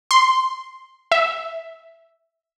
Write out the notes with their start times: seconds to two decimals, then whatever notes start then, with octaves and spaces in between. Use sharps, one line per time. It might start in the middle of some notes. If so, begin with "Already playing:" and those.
0.11 C6
1.12 E5